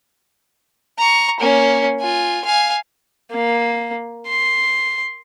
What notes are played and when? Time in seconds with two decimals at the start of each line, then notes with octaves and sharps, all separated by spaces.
0.98 A#5 C#6
1.40 A#3 C#4
2.01 F4 G#5
2.45 F5 G#5
3.31 A#3
4.27 C6